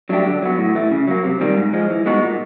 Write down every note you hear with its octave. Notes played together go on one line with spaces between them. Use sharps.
F#3 A3 D4 G4
D3
F#3 B3
A2
E3 A3
C#3
F#3 A#3
C3
D#3 G3 A#3
G#2
F3 G#3
E3
G#3 B3 D#4 F#4
A#2